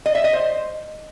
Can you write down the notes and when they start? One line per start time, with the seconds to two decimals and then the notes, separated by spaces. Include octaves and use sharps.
0.06 D#5
0.15 E5
0.24 D#5
0.33 C5